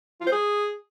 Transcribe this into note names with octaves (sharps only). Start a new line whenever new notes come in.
F4
C5
G#4